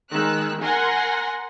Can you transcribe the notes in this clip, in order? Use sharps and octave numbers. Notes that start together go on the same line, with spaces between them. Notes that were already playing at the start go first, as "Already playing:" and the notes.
D#3 G#3 E6 F#6
A#4 F#5 G#5 C6 A#6